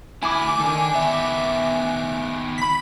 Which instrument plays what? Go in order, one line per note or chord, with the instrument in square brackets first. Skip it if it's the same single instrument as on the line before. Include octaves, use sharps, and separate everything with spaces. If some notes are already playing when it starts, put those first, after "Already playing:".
[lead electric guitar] D2 [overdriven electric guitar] E4 [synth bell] G#5 D6
[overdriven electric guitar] D#3 [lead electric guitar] A4 D5
[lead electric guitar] D#3 B3 [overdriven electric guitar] E5
[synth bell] B5 B6